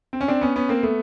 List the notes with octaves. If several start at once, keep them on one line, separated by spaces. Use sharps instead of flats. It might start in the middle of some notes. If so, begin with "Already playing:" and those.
C4
C#4
C4 D4
B3 C#4
B3 C#4
A#3 C4
A3 B3